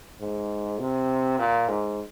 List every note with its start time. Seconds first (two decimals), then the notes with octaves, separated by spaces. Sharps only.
0.20 G#2
0.79 C3
1.39 A#2
1.68 G#2